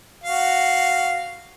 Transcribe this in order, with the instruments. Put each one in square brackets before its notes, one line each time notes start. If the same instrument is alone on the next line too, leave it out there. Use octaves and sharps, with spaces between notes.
[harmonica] F#4 F5